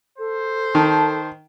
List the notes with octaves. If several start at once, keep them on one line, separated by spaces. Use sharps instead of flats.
A4 C5
D#3 A5